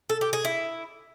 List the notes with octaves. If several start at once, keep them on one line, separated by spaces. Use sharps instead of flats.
A4
G4
G#4
E4